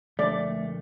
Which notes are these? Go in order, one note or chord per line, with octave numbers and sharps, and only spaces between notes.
D3 F3 A3 D5